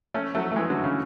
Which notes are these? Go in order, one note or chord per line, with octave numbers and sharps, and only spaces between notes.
A3 C#4
F#3 A3
A3
E3 G#3
D3 F#3
C#3